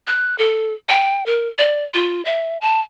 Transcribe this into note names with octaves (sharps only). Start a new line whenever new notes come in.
F#6
A4
G5
A#4
D5
F4
E5
A5